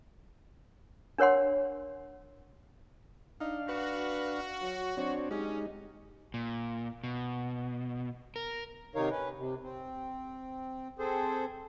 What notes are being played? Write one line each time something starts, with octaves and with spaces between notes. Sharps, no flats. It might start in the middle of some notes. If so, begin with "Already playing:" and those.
D4 A#4 C#5 F#5 C6
D4 D#4 F5
F#4 B4
F#3
F#3 C4 D4 C#5
G#3 C#4 D#4 G4
A#2
B2
A#4
C3 D#3 D#4 A#4 C#5 F5
C#4 B4
C3
C4
C4 G#4 A4 C5